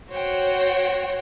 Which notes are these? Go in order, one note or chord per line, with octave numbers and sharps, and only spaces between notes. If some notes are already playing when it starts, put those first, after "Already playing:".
F#4 C5 C#5 F#5 G5